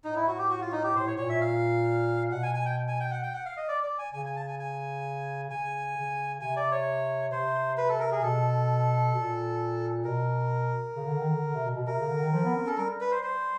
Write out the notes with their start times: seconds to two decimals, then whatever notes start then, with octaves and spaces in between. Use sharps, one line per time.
0.04 A2 D#4
0.16 E4
0.27 F#4
0.38 G4
0.50 F#4
0.61 F4
0.72 D#4
0.84 G4
0.96 A2 C5
1.07 C#5
1.18 A#2 C#5
1.29 E5
1.41 F5
2.31 B2 F#5
2.43 G#5
2.55 G#5
2.66 G5
2.88 G#5
3.00 G5
3.11 F#5
3.23 G5
3.34 F#5
3.46 F5
3.57 D#5
3.68 D5
3.83 D5
3.98 G#5
4.14 C#3 G#5
4.25 G#5
4.36 A5
4.48 G#5
4.59 G#5
5.50 C#3 G#5
5.96 C#3
6.40 C3 G#5
6.57 D5
6.72 C#5
7.32 C3 C5
7.78 B4
7.89 A4
8.00 A#4
8.12 G#4
8.22 B2 A4
9.14 A#2
10.05 B2 A#4
10.96 C#3
11.07 D3
11.19 D#3
11.30 D3
11.41 D3
11.53 C3
11.64 B2
11.75 B2
11.87 C3 A#4
11.99 C#3
12.09 D3
12.21 D#3
12.32 F3
12.44 B3
12.56 C4
12.67 C#4 A4
12.78 G3 A#4
13.01 B4
13.12 C5
13.23 C5